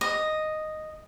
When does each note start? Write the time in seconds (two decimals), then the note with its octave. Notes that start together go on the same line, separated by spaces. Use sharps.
0.01 D#5